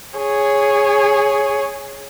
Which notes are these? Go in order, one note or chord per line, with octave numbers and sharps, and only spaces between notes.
G#4 C#5